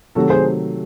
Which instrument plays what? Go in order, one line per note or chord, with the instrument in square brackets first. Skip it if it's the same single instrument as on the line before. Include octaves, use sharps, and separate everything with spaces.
[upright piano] C3 D#3 F#3 A3 [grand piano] F#4 A4
[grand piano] G#4 C5